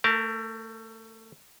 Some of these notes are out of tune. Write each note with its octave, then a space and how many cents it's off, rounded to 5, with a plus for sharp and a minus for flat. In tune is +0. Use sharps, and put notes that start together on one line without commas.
A3 +25 A#4 +0 A5 +0